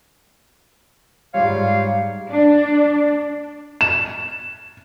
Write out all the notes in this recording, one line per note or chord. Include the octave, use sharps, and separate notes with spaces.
G#2 G3 F4 C#5 F5
D4
E7